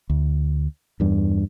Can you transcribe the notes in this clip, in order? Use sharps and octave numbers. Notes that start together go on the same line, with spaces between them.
D2
E2 G2